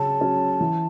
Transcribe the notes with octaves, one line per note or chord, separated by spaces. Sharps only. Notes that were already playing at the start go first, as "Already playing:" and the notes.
Already playing: C#3 F#3 C#4 A5
F#3 C#4
E3